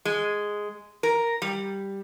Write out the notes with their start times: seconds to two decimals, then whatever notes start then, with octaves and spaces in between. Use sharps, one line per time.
0.05 G#3
1.03 A#4
1.42 G3